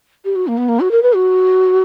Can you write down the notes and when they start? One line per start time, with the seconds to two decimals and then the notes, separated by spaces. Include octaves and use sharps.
0.25 G4
0.36 F#4
0.47 A#3
0.58 B3
0.69 A#3
0.80 F#4
0.91 A#4
1.03 B4
1.14 F#4